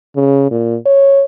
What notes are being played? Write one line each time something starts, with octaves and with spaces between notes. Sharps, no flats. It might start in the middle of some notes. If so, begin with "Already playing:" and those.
C#3
A#2
C#5